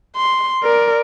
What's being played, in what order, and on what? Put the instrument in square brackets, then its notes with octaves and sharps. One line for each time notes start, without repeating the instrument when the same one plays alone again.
[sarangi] C6
[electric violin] A#4 [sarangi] D5